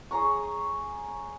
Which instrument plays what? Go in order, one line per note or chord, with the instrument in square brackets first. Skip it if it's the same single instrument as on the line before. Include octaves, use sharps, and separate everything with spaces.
[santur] G#4 C#5 A#5 C#6